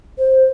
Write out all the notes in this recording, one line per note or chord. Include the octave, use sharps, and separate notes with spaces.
C5